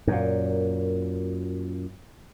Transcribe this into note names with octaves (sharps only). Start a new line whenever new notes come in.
F#2 A#2